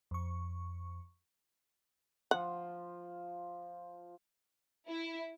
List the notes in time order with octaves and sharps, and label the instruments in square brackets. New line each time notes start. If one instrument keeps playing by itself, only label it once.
[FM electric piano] F2 C#6
[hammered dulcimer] F3 F4 [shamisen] F#5
[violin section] E4